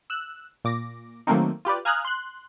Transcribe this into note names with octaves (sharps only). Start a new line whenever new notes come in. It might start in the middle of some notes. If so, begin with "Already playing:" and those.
E6 F#6
A#2 D6 A#6
D#3 F#3 A3 A#3 C4 D#4
F4 G4 B4 D5
F5 G#5 A#5 D#6 F6 F#6
C6 F#6